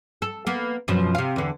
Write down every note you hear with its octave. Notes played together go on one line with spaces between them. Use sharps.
A4
A#3 B3
F#2 B2 F3
C3 F5
E2 D3